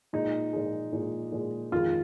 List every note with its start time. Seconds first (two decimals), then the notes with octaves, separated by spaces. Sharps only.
0.13 A#2 G#3 D#4
0.53 A#2 G#3
0.93 A#2 G#3
1.32 A#2 G#3
1.72 F2 D#3 G#3 F4